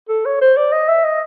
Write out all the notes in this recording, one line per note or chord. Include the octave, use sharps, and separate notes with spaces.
A4
C#5
C5
D5
D#5
E5
D#5